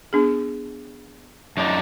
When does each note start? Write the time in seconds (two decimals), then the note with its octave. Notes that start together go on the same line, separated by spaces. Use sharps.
0.13 B3 D4 G#4
1.57 F#2 D4 D#4